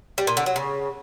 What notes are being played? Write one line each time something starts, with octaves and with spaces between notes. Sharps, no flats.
G3
A#2
D3
F#3
C#3